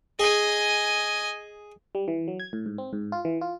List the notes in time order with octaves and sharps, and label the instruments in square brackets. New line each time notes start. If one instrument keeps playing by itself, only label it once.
[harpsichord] G#4 [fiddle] D#5 G#5
[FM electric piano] G3
E3
F#3
G#6
A2
G#2
C4
G#2
F4
E3
F4